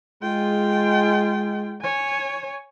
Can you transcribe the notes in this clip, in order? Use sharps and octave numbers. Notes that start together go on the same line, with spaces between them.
G#3 F4 G5
C#5 G#5